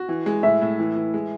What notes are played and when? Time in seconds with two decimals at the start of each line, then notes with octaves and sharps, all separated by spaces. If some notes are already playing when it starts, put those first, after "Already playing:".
Already playing: F#4
0.09 E3
0.26 G#3
0.43 A2 E5
0.61 A2
0.79 E3
0.96 E3
1.14 G#3